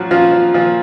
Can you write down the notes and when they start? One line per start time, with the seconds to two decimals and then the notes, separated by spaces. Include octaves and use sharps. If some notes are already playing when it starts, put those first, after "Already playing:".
Already playing: A#2 F3 F#3 F#4
0.11 A#2 F3 F4
0.32 F3
0.54 A#2 F3 F4